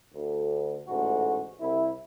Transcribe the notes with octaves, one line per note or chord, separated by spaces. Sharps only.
D2
A1 D2 G#2 F#4
C2 E4